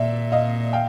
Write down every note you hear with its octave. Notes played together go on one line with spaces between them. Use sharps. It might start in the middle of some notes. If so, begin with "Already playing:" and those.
Already playing: A#2 D5 E5
D#5 F5
F5 G5